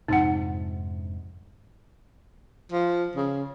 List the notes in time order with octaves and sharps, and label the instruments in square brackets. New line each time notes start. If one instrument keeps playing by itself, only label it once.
[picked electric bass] F2 G#2 C3 [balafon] D#4 F#5
[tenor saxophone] F3
C#3